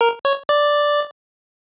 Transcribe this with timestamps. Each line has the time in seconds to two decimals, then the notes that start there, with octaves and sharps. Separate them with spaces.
0.01 A#4
0.25 C#5
0.49 D5